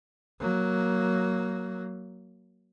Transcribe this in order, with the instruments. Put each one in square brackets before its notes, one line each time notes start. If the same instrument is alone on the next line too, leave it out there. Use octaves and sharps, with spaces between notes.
[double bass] F#3 A#3